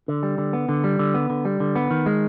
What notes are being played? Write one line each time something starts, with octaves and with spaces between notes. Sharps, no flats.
D3
G3
D3
B3
D3
G3
D3
B3
D3
G3
D3
B3
D#3
G#3